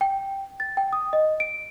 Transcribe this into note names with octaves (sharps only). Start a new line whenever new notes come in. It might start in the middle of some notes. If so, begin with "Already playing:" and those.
G5
A6
G5
D#6
D#5
D7